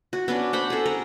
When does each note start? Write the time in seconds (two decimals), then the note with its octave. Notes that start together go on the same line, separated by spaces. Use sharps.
0.13 F#4
0.28 B3 C#4 D4
0.53 C5 F#5 B5
0.70 G#4 A4
0.86 A#4